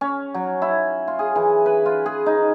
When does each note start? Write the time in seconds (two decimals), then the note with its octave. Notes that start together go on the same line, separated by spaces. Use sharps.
0.01 C#4
0.34 F#3
0.62 E4
1.08 F4
1.19 G#4
1.35 E3
1.66 B4
1.86 F4
2.06 G#4
2.26 D#4